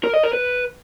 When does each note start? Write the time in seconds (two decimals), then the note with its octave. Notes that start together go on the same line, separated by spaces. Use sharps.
0.04 A#4
0.14 D#5
0.23 A#4
0.33 B4